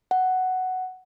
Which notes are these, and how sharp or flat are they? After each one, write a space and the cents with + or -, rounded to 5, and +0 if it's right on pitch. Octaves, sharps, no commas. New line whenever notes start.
F#5 +5